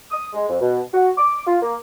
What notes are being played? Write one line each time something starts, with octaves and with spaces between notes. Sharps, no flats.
D#6
G#3
F2
B2
F#4
D6
F4
A#3